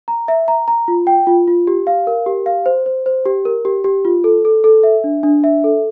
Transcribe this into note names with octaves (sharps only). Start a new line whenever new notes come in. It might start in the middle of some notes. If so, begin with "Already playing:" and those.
A#5
E5
A#5
A#5
F4
G5
F4
F4
G4
F5
A#4
G4
F5
C5
C5
C5
G4
A#4
G4
G4
F4
A4
A4
A4
E5
D4
D4
E5
A4